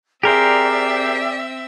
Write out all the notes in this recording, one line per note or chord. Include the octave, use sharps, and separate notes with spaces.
C4 G4 G#4 A#4 C5 D5 E5 G5